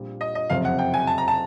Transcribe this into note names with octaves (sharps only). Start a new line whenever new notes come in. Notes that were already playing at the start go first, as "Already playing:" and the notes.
Already playing: A#1 A#2 G3 C4
D#5
D#5
F#1 F2 C3 F5
F#5
G5
G#5
A5
A#5
A5